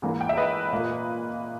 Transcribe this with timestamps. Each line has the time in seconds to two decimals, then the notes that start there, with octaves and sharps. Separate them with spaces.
0.02 G#2 E3 A#3
0.21 G5
0.29 E5
0.37 B4 D#5
0.72 A#2 A#3